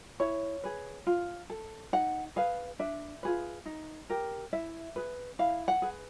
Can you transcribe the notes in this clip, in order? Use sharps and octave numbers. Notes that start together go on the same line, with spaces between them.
E4 C#5
G#4 B4
F4
A4
D#4 F#5
G#4 B4 F5
D4 E5
F4 G#4 B4
D#4
G4 A#4
E4 E5
G#4 B4
E4 F5
F#5
G#4 B4